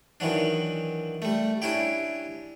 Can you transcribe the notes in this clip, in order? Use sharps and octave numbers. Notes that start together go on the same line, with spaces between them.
D#3 E3 F#3 D4
G3 A3
C#4 D4 E4 G4